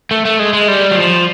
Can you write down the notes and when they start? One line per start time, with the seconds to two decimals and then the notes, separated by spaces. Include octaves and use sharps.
0.11 A3
0.25 A3
0.39 G#3
0.53 G#3
0.68 G3
0.91 F#3
0.96 F3